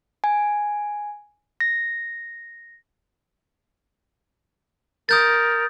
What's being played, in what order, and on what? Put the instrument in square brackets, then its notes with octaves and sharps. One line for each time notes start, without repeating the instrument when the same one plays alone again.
[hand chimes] G#5
A#6
[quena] A#4 [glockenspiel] D#6 G6 A6